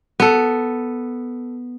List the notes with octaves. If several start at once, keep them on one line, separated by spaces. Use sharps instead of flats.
B3 A4